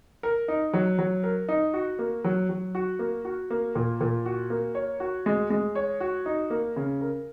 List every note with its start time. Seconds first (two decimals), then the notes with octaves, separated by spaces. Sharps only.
0.23 A#4
0.48 D#4
0.73 F#3
0.99 F#3
1.23 A#4
1.49 D#4
1.74 F#4
1.99 A#3
2.24 F#3
2.49 F#3
2.75 F#4
2.99 A#3
3.25 F#4
3.50 A#3
3.75 A#2
4.01 A#2
4.26 F#4
4.50 A#3
4.75 C#5
5.00 F#4
5.26 G#3
5.50 G#3
5.75 C#5
6.00 F#4
6.26 D#4
6.50 A#3
6.76 C#3
7.01 A#4